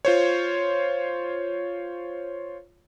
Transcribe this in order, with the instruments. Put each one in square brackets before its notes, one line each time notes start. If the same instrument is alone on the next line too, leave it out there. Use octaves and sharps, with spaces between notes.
[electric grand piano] F4 C5 C#5